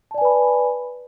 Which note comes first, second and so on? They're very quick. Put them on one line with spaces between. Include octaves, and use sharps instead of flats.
A5 D5 G#5 B4 B5